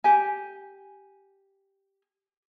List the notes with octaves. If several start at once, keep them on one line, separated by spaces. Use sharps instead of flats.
G4 G#5